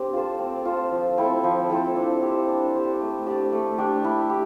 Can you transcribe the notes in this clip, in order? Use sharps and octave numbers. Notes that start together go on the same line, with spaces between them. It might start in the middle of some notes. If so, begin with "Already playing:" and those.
Already playing: C4 D4 G4
F4 A4 C5
C4
F4 A4 C5
F3
C4 E4 A4
F3
C4 E4 A4
D4
G4 C5
D4
G4 C5
A3
D4 G4 D5
A3
D4 G4 D5
E4
G4